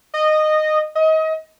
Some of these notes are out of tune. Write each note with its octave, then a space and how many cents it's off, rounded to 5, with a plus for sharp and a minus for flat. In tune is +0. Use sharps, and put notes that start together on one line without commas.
D#5 -15
D#5 +30